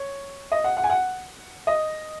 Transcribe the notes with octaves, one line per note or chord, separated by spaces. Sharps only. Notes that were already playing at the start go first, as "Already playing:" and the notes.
Already playing: C#5
D#5
F#5
F#5
G#5
F#5
D#5